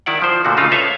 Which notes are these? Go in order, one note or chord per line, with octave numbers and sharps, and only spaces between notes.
D#3 E4 D5 F#5
F3 C5
A#2 D3 A3 F#4
C#3 A3 D#4 F4
A4 B4 C#5 E5 F5